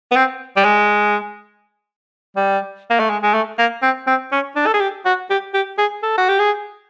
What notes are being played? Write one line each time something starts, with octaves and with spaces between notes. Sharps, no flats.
B3
C4
G3
G#3
G3
A#3
A3
G#3
G#3
A3
A#3
C4
C4
C#4
D4
A4
G#4
G4
F#4
G4
G4
G#4
A4
F#4
G4
G#4